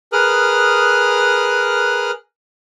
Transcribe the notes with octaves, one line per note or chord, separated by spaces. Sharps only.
G#4 A#4 B4 D#6 F6 F#6